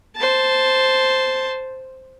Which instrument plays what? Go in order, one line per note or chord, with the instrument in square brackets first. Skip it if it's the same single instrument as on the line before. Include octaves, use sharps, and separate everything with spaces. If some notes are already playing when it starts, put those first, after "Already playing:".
[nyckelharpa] C5 A5